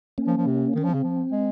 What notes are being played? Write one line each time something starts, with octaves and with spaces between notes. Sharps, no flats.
A#3 C#4
F3
F3
C3
D#3
C#4
F3
C#3 C4
F3
G#3